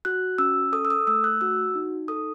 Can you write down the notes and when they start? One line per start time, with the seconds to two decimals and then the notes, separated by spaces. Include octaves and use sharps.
0.05 F#4 F#6
0.38 C#4 E6
0.73 A4 D#6
0.85 E6
0.90 D#6
1.07 A3 E6
1.24 F#6
1.41 F#4 E6
1.75 D#4
2.08 A4 D#6